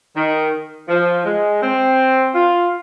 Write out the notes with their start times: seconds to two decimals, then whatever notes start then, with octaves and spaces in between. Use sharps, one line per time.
0.16 D#3
0.89 F3
1.25 G#3
1.62 C4
2.35 F4